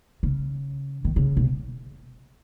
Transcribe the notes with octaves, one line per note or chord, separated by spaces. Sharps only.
C#3
D#3
C#3
B2